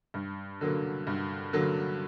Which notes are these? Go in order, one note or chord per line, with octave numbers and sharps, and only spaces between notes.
G2
D3 F#3 A#3
G2
D3 F#3 A#3